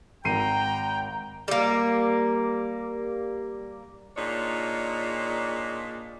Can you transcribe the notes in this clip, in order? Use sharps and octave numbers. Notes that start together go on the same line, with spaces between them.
G#1 G5 A#5 C7 D#7
G3 A#3
A#2 D4 D#4 G#4 C#5